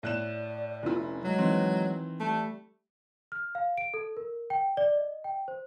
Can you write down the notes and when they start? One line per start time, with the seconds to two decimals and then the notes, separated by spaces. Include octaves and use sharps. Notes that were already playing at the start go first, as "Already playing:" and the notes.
0.03 A2 D5 F#6 E7
0.83 F1 C#4 E4
1.24 F#3 G#3
1.38 D#3 E3 C4
2.20 G3 A3
3.32 F6
3.55 F5
3.78 D7
3.94 A4
4.17 A#4
4.50 G5
4.77 D5
4.96 D#5
5.24 G5
5.48 C5